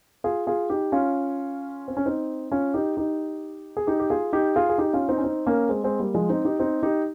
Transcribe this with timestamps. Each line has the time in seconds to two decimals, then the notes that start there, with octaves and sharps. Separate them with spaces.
0.24 F4 G#4
0.47 F4 G#4
0.70 D#4 G4
0.92 C#4 F4
1.88 C4
1.97 C#4
2.06 C4 D#4
2.52 C#4 F4
2.74 D#4 G4
2.97 D#4 G4
3.77 G#4
3.87 D#4 G4
4.00 G4
4.10 F4 G#4
4.33 D#4 G4
4.56 F4 G#4
4.69 G#4
4.78 D#4 G4
4.93 C#4 F4
5.08 C4 D#4
5.18 C#4
5.24 C4 D#4
5.46 A#3 C#4
5.69 G#3 C4
5.84 G#3 C4
5.99 G3 A#3
6.14 F3 G#3
6.29 C4 D#4
6.45 D#4 G4
6.59 C4 D#4
6.83 D#4 G4